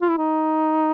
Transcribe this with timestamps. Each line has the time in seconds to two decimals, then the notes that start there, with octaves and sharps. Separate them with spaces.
0.01 F4
0.09 E4
0.18 D#4